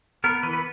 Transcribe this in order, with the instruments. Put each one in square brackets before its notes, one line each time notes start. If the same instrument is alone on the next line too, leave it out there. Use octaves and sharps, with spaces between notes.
[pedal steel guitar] B3 A#4
E3 B4
B4